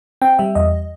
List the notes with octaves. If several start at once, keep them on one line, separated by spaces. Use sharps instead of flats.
C4 G5
G3 E5
E2 D#5